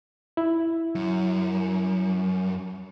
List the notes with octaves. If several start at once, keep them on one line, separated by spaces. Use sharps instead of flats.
E4
F#2